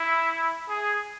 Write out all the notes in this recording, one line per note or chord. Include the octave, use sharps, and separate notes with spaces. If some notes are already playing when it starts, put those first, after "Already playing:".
Already playing: E4
G#4